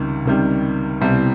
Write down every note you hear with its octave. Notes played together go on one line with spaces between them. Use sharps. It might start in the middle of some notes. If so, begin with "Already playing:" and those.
Already playing: C#2 C3 D#3 G3
C#2 C3 D#3 G3
C2 B2 G3 C4 E4